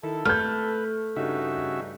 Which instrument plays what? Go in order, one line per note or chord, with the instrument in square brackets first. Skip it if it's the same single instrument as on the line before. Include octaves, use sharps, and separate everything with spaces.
[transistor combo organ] D#3 E4 [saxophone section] A4
[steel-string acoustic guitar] A3 [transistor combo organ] B4 [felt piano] F6 G6
[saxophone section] G2 D#4 [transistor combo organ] C#3 F#4 E5